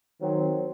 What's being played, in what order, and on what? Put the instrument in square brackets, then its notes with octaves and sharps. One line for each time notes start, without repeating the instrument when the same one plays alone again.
[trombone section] D#3 F#3 C4